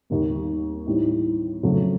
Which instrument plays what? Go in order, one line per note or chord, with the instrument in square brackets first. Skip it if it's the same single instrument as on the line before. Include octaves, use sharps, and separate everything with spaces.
[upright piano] D#2 D#3 G3 A#3
A2 E3 G3 C4 D#4
F2 C#3 F#3 A3